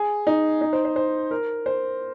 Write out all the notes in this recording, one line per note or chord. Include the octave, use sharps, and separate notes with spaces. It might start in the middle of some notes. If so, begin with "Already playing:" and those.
Already playing: G#4
D#4
D#4
C5
C5
C5
A#4
C5